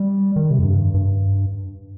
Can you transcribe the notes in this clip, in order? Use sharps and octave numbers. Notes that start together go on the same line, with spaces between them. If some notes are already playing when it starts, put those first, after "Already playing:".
Already playing: G3
D#3
C3
F2
G2
G2